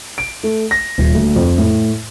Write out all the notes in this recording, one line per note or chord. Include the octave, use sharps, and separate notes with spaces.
D7
A3
A#6
D#1
D2
F2
A2